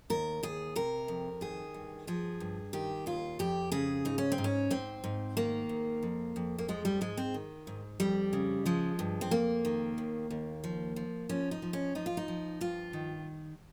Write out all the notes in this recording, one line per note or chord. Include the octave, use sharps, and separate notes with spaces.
D#2 A#4
D#2 G#4
C3 A#4
F2
D#3 G#4
G2
F3 G#4
G2
D#3 G4
D#2 F4
F2 G4
C#3 G#4
G#2 D#4
C#4
C4
G#2
C#4
G#2 C4
G#2
D#3 A#3
G#2
F2
F2
A#3
F3 G#3
G3
G#2 G#3
C4
D#3
G#2
F2 G3
C#3
F3 G#3
G2
C4
F2 A#3
D#3
D#2
D#2
F3
F3
F3 C#4
D#4
F3
C#4
F3 D#4
F4
D#4
F3
G2 F4
D#3